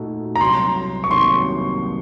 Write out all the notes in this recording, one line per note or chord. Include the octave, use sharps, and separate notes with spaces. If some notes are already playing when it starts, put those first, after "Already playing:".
Already playing: A#2 A3 D#4 F#4 A4
A#5
C2 C3 F#3 C6
C#6
C2 C3 D#3 F#3 A#3 C6